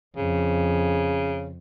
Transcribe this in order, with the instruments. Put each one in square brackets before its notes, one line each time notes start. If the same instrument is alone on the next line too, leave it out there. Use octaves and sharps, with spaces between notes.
[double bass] F2 [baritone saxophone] C#3